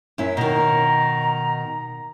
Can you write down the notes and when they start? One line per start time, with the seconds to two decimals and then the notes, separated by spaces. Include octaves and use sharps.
0.18 F#2 E4
0.37 B2 D#3 A#5